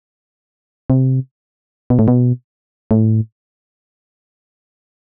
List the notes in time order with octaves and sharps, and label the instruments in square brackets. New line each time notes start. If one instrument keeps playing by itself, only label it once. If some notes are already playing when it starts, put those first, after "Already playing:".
[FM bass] C3
B2
A2
B2
A2